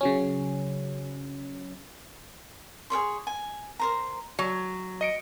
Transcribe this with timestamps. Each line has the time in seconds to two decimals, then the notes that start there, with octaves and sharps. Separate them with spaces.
0.01 C#3 F#3 C#4
2.90 G#4 A#4 C#5 C6
3.27 G#5
3.79 A#4 C5 A#5
4.39 F#3
5.01 D#5 C#7 D7